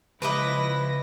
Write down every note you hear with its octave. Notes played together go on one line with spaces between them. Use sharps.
C#2 F3 E4 B4 D#5 B5 D6 A#6